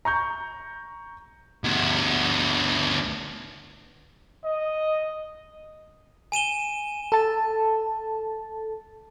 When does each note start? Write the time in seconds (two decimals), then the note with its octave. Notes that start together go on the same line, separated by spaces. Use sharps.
0.05 A#5 C#6 G6
1.64 D2 B3
4.44 D#5
6.32 G#5 D#7 E7 G7
7.12 A4 A5